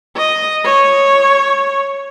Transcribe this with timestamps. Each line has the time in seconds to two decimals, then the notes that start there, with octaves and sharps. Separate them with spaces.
0.17 D#5
0.65 C#5